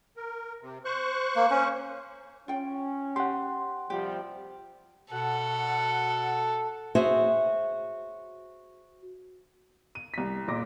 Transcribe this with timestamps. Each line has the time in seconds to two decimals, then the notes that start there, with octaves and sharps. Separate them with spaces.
0.17 A#4
0.61 C3
0.85 C5 C#6 F#6
1.36 A#3
1.51 C#4
2.48 C#4 F4 G5
3.16 G4 F#5 C6
3.90 C3 F3 G3 G4
5.12 B2 A4 F#5
6.95 F#4 G#4 C5 C#5 E5
9.95 D#7
10.14 C2 B6
10.48 F#1 A#2 D6 A#6